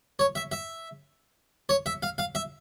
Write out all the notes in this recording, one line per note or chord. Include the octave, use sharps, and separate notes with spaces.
C#5
E5
E5
C#5
E5
F5
F5
E5